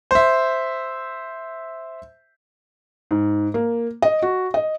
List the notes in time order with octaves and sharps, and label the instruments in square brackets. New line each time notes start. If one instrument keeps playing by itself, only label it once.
[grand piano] C5 E5
[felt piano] G#2
A#3
D#5
F#4
D#5